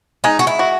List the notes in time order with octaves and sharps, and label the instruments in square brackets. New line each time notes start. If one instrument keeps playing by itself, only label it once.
[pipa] G#3 [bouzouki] D#4
[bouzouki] F#4
E4
[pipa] F#4